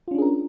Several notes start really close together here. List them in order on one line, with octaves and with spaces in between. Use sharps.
F4 C#4 D4 G#4 A#4